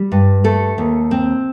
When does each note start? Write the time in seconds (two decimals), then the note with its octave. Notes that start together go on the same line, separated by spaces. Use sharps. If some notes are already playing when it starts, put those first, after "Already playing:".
Already playing: G3
0.12 G2
0.44 A3 A4
0.78 D#2
1.11 C4